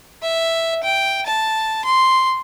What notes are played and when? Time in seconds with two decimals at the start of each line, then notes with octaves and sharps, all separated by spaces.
0.23 E5
0.84 G5
1.26 A5
1.85 C6